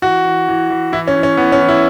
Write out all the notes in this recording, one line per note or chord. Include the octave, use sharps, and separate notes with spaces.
E3 F#4
E3
E3
E3
E3 E4
C#4
E3
C#4
E3 B3
C#4
E3
E4